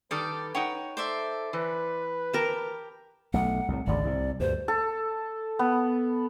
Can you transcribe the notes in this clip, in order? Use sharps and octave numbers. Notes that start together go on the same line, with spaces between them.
D#3 G3 A4 B4 D5 D#6
D#4 C#5 F#5 G5
A4 C5 D5 E5
E3 B4
G4 A#4 A5
B1 A3 F#5
C2 A2
G#1 D2 C#3 D5
C2 C3
D2 G2 C5
A4
B3